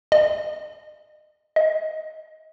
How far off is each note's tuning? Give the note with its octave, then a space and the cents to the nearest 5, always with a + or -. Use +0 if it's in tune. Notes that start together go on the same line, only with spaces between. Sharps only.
D#5 -35
D#5 +20